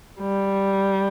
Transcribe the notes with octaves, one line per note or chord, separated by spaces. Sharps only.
G3